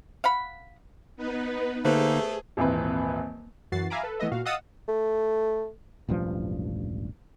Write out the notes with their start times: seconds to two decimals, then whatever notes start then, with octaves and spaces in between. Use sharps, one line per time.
0.24 F5 F#5 B5
1.16 B3 D#4 B4
1.85 D3 A3 A#3 D#4 G4 G#4 B4 C5
2.57 D#1 G#1 E3 C4 B4
3.72 F#2 E3 F#4 A6 C7
3.90 E5 F5 G#5 A#5 B5 D6
4.03 A4 B4
4.20 E3 A3 B3 D#5 E5
4.32 A#2 F#4 F5
4.45 D#5 F5 F#5 D#6 E6 A6
4.88 A3
6.09 E1 A1 G2 F3